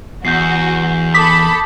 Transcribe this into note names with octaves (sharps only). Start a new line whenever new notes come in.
E2 F#4 G6 C7
A4 A5 B5 D6 D#6 B6